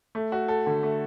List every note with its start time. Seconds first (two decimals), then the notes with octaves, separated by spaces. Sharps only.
0.15 A3
0.32 F#4
0.48 A4
0.66 D3
0.83 A3